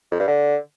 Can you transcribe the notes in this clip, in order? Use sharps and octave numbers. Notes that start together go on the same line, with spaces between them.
F2
G2
D3